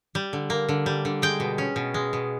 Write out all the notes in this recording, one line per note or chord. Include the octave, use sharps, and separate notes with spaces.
G3
D3
A#3
D3
G3
D3
G#3 G5
B2
C#4
B2
G#3
B2